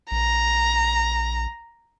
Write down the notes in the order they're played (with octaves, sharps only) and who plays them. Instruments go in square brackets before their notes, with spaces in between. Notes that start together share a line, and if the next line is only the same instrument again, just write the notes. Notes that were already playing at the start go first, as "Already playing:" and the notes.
[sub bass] A#1 [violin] A#5